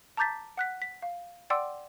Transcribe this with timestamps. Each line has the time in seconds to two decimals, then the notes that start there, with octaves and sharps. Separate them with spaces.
0.17 A5 A#5 D6 G6 A6 B6
0.57 F#5 F#6 B6
0.82 B6
1.02 F5
1.50 D5 F#5 G5 C6 D6 E6